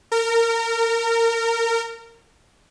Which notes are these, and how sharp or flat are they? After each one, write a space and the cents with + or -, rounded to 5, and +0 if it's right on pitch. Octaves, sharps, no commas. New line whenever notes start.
A#4 -25